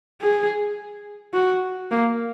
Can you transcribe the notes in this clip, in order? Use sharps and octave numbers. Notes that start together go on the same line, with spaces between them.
G#4
F#4
A#3